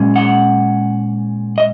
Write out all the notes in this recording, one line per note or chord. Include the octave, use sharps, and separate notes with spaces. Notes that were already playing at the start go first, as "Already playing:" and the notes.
Already playing: A#2 G#3 C#4
F#5
D#5